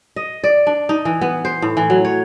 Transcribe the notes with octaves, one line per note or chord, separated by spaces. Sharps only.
D#5
D5
D4
D#4
E3
B3
C5
A2
E3
F#3
C#5